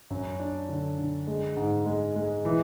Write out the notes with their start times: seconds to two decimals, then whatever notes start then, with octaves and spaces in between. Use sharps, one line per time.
0.10 F#2
0.39 D4
0.69 D3
0.98 D3
1.27 G#3
1.57 G#2
1.86 G#3
2.16 G#3
2.45 E3